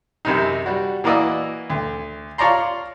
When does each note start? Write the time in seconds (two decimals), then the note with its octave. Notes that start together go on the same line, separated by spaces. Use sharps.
0.25 F#2 C3 D#4
0.66 G3 F#4
1.04 E3 A#3 F#4 D5 D#5 E6
1.70 D2
2.38 F4 C#5 D5 A5 A#5 C6